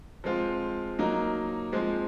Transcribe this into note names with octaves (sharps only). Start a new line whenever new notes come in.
F3 G#3 C4 F4
F#3 A#3 D#4
F3 G#3 C4